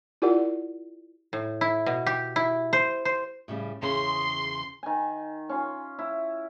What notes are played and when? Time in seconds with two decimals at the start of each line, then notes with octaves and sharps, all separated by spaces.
0.22 E4 F4 G4 A#4 D5 F#5
1.33 A2
1.61 E4
1.86 B2
2.06 G4
2.36 E4
2.73 C5
3.05 C5
3.48 A2 C#3 G3
3.83 E2 C#3 G#4 C6
4.83 D#3 G#5
5.49 C#4 F4
5.99 E4